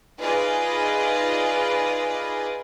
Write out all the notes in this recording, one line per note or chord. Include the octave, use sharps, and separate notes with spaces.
D#4 F4 G#4 B4 D5 D#5